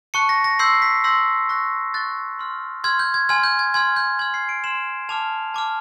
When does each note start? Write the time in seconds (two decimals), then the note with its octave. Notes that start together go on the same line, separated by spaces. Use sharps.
0.14 A5 C#6 F#6 C#7
0.29 A#6
0.44 A#6
0.59 C6 E6 G6 C7
0.82 B6
1.04 C6 E6 G6 A#6
1.49 C#6 F#6 A#6
1.94 C#6 F#6 A6
2.39 C6 F6
2.84 C6 F6 G#6
2.99 G6
3.14 G#6
3.29 G#5 C6 F6 G#6
3.44 G6
3.59 G#6
3.74 G#5 C6 F6 G#6
3.96 G6
4.19 C6 F6 G#6
4.34 C7
4.49 D7
4.64 C6 F6 E7
5.09 A5 D6 F6 F7
5.54 A5 D6 F6